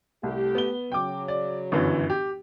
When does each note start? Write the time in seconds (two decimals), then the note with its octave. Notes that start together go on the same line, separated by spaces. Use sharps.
0.23 C2 A3 G4
0.55 B3 G7
0.92 C#3 F#3 G5 D6
1.28 D5
1.72 G1 F#2 E3
2.10 G4